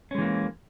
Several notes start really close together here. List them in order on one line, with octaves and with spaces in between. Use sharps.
C#4 G#3 E3 A#3